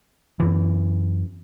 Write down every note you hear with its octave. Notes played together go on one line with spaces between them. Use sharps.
F#2 E3